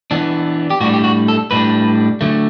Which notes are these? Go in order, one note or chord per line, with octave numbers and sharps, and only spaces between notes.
E3 B3 D4
G4
A2 G3 D4 F#4
G4
F#4
A4
A2 G3 D4 B4
D3 F#3 A3